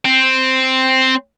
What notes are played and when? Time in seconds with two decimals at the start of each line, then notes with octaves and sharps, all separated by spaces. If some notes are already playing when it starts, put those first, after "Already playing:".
0.05 C4